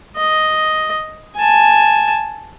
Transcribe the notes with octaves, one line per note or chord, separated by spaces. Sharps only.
D#5
G#5 A5